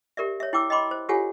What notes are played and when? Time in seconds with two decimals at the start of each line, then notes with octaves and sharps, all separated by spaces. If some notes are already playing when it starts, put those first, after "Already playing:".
0.17 G4 A#4 D5 E5
0.40 C#5 E5
0.53 E4 G5 D6 E6
0.70 D#5 G5 B5 C6 D6
0.91 C5
1.09 F4 G4 A4 C#5 F#5 G#5